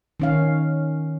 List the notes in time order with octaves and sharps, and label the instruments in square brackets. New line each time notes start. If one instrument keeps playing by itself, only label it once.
[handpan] D#3 C#4 F5